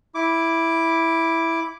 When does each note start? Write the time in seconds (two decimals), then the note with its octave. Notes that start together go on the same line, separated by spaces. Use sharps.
0.15 E4 D6